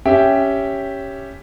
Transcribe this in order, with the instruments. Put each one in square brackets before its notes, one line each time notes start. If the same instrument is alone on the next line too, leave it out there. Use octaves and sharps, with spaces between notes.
[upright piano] C#4 G4 E5 G5